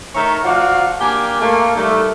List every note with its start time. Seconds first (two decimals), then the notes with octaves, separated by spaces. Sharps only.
0.15 D#3 A3 C#5 E5 A#5
0.44 F3 F#4 D5 F5 F#5
1.01 A#3 D4 G4 G#5
1.41 A3 A#3
1.76 D#3 G3 A3